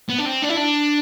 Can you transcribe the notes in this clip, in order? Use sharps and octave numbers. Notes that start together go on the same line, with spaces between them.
B3
D4
C4
D4
E4
D4